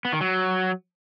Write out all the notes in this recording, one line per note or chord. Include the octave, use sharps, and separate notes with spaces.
B3
D#3
F#3